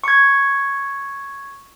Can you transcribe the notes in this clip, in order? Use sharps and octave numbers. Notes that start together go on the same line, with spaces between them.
C#6 G#6